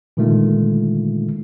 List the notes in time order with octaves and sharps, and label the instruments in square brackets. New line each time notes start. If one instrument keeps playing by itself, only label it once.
[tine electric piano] A#2 D3 D#3 G#3 A3 F4